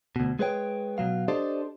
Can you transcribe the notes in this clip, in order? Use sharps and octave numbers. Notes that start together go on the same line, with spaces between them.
D2 B2
G#3 G#4 B4 C#5 G5
B2 F#3 F5
D4 G4 A4 C5 D5 D#5